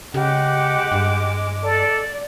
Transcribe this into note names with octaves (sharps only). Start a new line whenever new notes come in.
C#3 G#3 G4 F#5 D6
G2
A4 D5